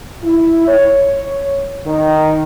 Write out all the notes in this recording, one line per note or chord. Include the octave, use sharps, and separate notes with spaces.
E4
C#5
D#3